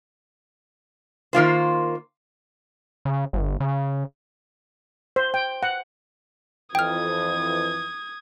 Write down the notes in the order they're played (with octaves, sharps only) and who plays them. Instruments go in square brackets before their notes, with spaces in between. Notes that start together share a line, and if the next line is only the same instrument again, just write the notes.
[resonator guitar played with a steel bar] D#3 A#3 F4 C5
[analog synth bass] C#3
G1
C#3
[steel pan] C5
G5
F#5
[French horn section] F2 E3 [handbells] G5 F6 [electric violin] D#6 G#6